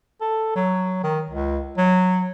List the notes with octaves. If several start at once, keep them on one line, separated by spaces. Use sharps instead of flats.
A4
F#3
D#3
C#2
F#3